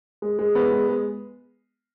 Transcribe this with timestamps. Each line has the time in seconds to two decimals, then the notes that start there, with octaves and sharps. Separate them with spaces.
0.22 G#3
0.39 G#3
0.55 B3
0.71 G#3
0.89 G#3